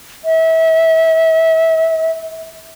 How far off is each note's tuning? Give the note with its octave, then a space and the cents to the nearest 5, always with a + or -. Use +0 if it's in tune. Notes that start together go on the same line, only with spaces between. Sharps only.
E5 -30